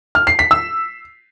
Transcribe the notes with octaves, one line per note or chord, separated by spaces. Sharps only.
F6
C7
B6
E6